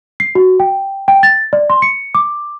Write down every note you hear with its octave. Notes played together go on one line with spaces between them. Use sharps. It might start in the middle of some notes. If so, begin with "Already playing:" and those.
C7
F#4
G5
G5
A6
D5
C6
C#7
D6